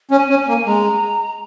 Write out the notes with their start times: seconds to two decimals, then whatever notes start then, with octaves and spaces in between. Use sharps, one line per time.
0.11 C#4
0.17 G#5
0.30 C#4
0.42 G#5
0.48 A#3
0.66 G#3 A#5